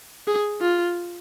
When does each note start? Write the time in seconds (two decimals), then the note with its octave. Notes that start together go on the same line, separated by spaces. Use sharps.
0.27 G#4
0.61 F4